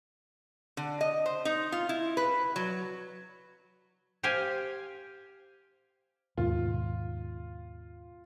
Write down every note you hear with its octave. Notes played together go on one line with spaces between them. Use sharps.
D3
D#5
C5
D#4
F4
E4
B4
F#3
G4 C5 F5 G5 G#5
D#2 G#2 B2 F4